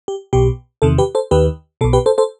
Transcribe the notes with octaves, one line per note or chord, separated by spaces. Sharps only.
G4
B1 B2 G4
E2 C3 D#3 A4
G4 B4
A4 C5
D#2 D#3 G4 B4
B1 B2 A4
G4 B4
A4 C5
A4 C5